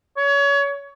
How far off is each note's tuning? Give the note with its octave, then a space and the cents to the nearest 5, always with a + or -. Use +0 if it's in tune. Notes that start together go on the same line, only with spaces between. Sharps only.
C#5 +30